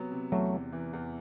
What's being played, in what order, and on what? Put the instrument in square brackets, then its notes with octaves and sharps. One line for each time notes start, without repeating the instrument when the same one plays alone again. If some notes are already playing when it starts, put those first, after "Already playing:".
Already playing: [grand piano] C3 F#3 B3
C3
[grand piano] E2 [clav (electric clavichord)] F#3 A3
[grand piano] C3
E3
E2